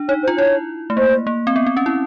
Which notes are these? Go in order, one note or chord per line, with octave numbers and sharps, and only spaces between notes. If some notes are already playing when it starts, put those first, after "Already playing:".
Already playing: D4
D#4 C#5
C5
F4
E4 C#5
A3
A#3 C5
A#3
C4
B3
C4
C#4
E4